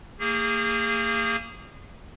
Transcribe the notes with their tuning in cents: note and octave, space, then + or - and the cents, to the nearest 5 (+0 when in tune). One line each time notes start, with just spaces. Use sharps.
A#3 -30 G#4 -25